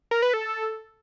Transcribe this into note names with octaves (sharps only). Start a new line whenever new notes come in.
A#4
B4
A4